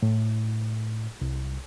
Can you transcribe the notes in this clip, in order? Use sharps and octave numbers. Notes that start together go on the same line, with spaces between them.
A2
C2